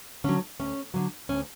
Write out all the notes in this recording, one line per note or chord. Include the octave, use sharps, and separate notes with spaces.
D3 F#3 C#4
D2 C#4
D3 F#3
D2 C#4